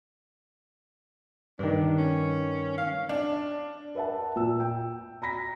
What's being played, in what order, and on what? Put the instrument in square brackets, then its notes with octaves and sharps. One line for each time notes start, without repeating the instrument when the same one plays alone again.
[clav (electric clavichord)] G2 D#3 [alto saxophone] D4
[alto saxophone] C#4
F5
[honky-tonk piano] D4
[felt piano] A#4 B4 E5 F#5 A5
A#2 E6
G5
A#5 B5 A#6 B6